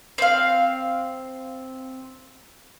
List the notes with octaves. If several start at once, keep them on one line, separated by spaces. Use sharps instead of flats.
C4 F5